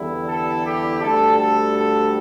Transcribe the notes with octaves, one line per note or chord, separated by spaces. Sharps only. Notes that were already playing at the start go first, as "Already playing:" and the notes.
Already playing: E2 D3 G3 E4
A4
G4
D2 D3 G3 A4
A4
A4